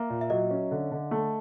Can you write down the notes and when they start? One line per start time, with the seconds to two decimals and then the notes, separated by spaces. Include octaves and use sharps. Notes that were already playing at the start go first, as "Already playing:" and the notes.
Already playing: A#3 E5
0.10 A#2
0.21 E5
0.30 F#3 D#5
0.51 C#4
0.71 D3
0.92 D3
1.11 A3